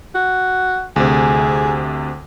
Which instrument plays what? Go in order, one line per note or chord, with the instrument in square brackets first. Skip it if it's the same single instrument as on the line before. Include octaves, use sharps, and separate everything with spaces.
[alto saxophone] F#4
[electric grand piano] D2 C3 [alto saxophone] G#4